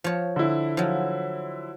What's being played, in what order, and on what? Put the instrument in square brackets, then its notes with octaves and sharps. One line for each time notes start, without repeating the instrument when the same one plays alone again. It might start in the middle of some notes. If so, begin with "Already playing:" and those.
[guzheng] F3 C#5
[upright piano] D3 E4
[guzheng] F3 F#3